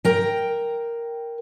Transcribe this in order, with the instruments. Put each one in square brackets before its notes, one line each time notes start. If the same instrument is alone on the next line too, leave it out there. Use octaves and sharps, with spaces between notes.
[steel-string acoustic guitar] A#4 G5